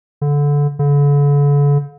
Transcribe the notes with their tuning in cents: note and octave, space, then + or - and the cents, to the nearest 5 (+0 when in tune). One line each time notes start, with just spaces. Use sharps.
D3 -20
D3 -40